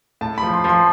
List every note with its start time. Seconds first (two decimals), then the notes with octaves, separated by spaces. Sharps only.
0.21 A2 A5
0.38 B5
0.43 F3
0.54 C6
0.64 F3 C6